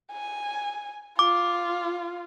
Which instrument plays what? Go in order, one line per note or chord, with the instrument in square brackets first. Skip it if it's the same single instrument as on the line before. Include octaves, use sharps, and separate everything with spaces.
[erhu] G#5
[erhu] F4 [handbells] D6